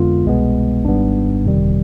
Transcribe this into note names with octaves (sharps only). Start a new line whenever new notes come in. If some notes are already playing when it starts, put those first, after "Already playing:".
Already playing: F2 D3 G#3 B3 F4
C2 B2 G#3 B3
G#1 G#2 G3 B3 D4
G1 F2 C3 D#3 G3